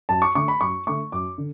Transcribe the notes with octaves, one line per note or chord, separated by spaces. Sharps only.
F#2 A5
C#6
D3 A3 C#6
B5
F#2 C#6
D3 A3 C#6
F#2 D6
D3